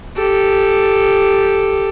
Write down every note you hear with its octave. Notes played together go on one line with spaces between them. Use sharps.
G4 A4